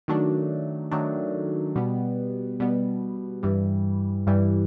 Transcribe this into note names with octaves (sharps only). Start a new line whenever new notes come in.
D#3 F#3 A3 D4
D#3 F#3 A3 D4
B2 G3 B3
B2 G3 B3
G2 E3 G3
G2 E3 G3